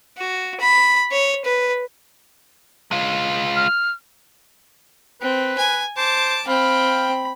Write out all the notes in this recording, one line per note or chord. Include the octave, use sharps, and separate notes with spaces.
F#4
B5
C#5
B4
G#3 F4
F6
C4 B4
G#5
C5 A5 D6
C4 F5 G5 B5